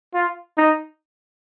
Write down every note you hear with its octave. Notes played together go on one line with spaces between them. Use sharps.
F4
D#4